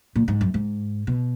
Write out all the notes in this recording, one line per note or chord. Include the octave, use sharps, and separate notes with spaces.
A#2
G#2
F#2
G#2
B2